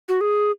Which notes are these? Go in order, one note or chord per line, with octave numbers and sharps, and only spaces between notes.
F#4
G#4